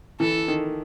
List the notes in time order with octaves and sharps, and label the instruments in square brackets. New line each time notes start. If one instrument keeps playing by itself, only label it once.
[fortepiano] E3 [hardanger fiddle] A4
[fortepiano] D#3